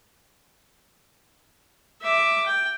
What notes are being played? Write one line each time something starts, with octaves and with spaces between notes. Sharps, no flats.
E5 D6
G5